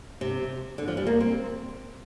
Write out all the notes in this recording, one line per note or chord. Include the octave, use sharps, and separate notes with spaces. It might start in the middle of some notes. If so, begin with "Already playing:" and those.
C3
D3
F3
G3
A#3
C4